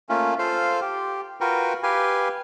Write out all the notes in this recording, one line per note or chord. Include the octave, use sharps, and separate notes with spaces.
A3 A#3 C#4 F4
F4 A4 C5 F5
G4
F4 F#4 A#4 B4 G5
G4 B4 F5 G#5